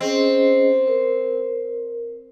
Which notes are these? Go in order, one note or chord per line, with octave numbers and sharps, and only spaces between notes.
C4 C#4 G#4 D#5
A#4